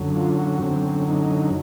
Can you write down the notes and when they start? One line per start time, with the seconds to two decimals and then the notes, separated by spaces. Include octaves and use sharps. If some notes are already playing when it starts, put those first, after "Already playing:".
Already playing: F#2 D3 F#3
0.16 F4
0.39 F#4
0.62 F#2 D3 F#3 C4
1.09 D#4